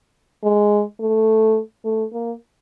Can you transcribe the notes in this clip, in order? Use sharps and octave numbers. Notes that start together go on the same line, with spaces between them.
G#3
A3
A3
A#3